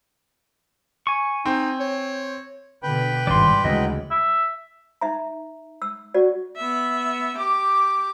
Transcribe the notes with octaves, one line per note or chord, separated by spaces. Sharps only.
G#5 C#6
C4 D#4
C#5
B2 D3 B4 G5 B5
G#1 G2 C#3 D5 C6
D2 C#3 E3 F#3 G#3 D#5
E5
D#4 E5 A#5
E6
F#4 D5
B3 E5
G4 D6